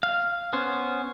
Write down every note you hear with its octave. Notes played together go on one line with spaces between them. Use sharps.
F5
B3 C#4 C5